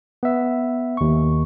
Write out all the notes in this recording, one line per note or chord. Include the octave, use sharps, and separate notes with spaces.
B3 E5
D#2 C#6